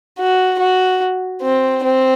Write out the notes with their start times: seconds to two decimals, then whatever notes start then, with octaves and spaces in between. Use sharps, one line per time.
0.19 F#4
0.59 F#4
1.42 C4
1.84 C4